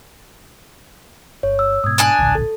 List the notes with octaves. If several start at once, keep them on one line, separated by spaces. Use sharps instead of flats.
G1 C#5
E6
G#2 B2 D#6 G#6
D4 G#5 F#6
D1 A#1 D3
A4